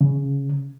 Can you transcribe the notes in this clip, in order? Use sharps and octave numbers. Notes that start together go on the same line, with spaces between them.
C#3